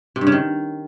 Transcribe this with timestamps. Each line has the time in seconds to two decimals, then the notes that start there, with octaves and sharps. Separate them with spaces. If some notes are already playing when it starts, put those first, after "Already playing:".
0.16 C3
0.21 G2
0.27 C#3
0.32 D#3